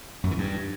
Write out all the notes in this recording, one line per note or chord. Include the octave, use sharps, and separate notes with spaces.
F#2
E3
G2